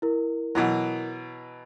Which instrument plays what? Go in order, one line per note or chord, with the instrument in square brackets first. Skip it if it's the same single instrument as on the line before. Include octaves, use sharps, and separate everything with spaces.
[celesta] E4 A#4
[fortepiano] B2 E3 F#3